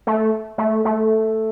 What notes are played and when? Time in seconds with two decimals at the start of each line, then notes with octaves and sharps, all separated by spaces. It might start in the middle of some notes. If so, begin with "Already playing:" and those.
0.07 A3
0.58 A3
0.85 A3